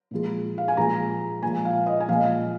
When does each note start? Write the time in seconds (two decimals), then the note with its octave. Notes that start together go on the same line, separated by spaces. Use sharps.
0.11 A#2 F3 G#3
0.58 F5
0.68 G#5
0.77 A#2 F3 G#3 A#5
1.43 A#2 F3 G#3 G#5
1.65 F5
1.86 D#5
2.00 G#5
2.08 A#2 F3 G#3 F5